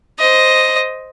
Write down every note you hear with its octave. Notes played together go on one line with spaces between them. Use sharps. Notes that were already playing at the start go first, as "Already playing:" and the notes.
C5 D#5